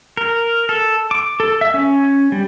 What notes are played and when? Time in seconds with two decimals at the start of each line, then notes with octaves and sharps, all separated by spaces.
0.17 A#4
0.69 A4
1.11 D6
1.40 A4
1.61 E5
1.74 C#4
2.32 G3